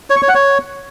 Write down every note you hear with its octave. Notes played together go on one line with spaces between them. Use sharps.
C#5
C#6
C#5
F#5
C#5